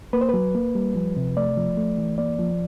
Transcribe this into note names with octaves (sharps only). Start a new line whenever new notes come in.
A#3 B4
C5
F#3 B4
A#3
G3
F3
C3
A3 D5
F3
A3
E3
A#3 D5
F3